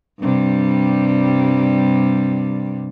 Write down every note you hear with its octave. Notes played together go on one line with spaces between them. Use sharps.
G2 C3 G3